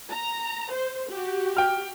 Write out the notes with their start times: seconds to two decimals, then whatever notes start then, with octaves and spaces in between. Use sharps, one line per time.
0.11 A#5
0.73 C5
1.09 F#4 G4
1.57 G5 F6